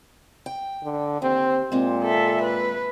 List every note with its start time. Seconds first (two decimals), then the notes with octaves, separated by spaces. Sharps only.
0.46 G5
0.84 D3
1.22 D#2 C4
1.72 A#2 G#3 C4
2.03 A4 E5
2.42 B4